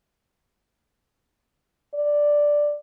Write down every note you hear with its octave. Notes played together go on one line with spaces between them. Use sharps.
D5